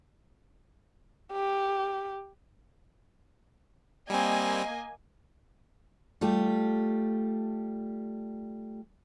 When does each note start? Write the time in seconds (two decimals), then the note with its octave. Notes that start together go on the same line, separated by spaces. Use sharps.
1.33 G4
4.10 G3 A#3 C4 D#5 G#5
6.21 G3 A3 F4 G4